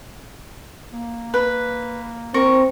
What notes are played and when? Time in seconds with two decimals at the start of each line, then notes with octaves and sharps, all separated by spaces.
0.92 A#3
1.34 B4
2.34 C4 A#4 C#6